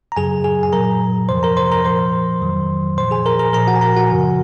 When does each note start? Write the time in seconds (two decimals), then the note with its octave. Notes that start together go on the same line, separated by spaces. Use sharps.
0.12 A#5
0.17 F#2 C#3 F#3 G#4 G#5
0.44 G#4 G#5
0.63 G#5
0.73 A#2 F#3 A#4 A#5
1.29 F2 C3 F3 C5 C6
1.43 A#4 A#5
1.57 C5 C6
1.72 A#4 A#5
1.85 A#2 F3 C5 C6
2.41 F2 D#3 F#3
2.97 A#2 F3 C5 C6
3.11 G#4 G#5
3.26 A#4 A#5
3.39 A#4 A#5
3.53 A#2 F3 A#4 A#5
3.67 F#4 F#5
3.76 G#5
3.81 A#4 A#5
3.97 F#4 F#5
4.10 F#2 C#3 F3